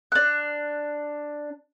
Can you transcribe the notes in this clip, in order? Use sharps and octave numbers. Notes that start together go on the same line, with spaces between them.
D4 F#6